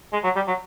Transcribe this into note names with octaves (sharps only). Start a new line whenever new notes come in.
G#3
F#3
G3
F#3